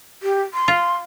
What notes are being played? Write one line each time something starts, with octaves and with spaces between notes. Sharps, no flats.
G4
C6
F4